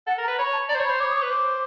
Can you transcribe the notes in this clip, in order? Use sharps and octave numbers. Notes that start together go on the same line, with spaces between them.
A4 F#5
A#4
A#5
B4
C#5 B5
A5
D5 A#5
C5
C#5
B5
C5
C#5 D6
D#6
D6
B4
C5 D6